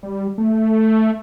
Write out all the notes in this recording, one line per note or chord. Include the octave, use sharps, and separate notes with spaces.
G3
A3